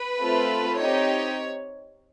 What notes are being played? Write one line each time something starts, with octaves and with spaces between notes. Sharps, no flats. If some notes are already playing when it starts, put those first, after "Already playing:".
Already playing: B4
A3 C4 F4 A4
C4 D#4 G4 C#5